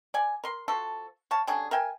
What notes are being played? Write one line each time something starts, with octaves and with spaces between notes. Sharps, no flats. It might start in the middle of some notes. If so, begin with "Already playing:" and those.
D5 G#5
A#4 C6
F3 F#4 A4
C#5 F5 A5
D3 G3 C#4 G#4
A#4 E5 G5 G#5